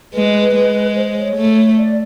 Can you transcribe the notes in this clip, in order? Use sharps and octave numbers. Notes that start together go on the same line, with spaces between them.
G#3 B4
G#3
C5
C#5
A3
D5